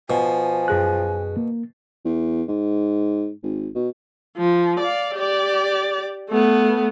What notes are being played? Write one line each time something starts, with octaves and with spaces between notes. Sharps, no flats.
B2 F3 G#5
F#2 G#4 F#6
A#3
E2
G#2
G#1
B2
F3
D5 F5
G4 D5
A3 B3